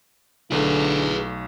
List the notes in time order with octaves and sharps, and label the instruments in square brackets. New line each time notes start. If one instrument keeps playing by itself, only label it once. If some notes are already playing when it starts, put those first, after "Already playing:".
[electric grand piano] B1 A3 [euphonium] D3 [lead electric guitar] G#4 B4